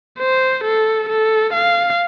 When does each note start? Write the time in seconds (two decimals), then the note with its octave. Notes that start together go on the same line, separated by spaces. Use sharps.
0.19 C5
0.64 A4
1.09 A4
1.53 F5